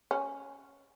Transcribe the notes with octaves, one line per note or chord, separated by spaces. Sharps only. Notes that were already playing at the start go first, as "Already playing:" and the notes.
C#4